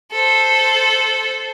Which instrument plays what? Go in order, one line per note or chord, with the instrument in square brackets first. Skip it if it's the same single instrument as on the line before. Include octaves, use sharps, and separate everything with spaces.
[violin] A4 C5